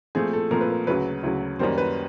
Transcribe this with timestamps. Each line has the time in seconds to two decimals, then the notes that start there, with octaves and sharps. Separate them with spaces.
0.15 A#2 F3 A3 C4 G#4
0.33 A4
0.51 A#2 F3 A3 C4 A#4
0.61 B4
0.70 A#4
0.87 D2 C#3 F#3 B4
1.23 D2 C#3 F#3
1.59 F#2 D#3 G3 A#3 C5
1.78 B4